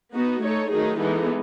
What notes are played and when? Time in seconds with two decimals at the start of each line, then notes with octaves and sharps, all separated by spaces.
0.14 B3 D#4 F#4
0.42 A3 D#4 A4 C#5
0.71 D#3 F#3 A3 D#4 G#4
0.99 E3 G#3 B3 D#4 A4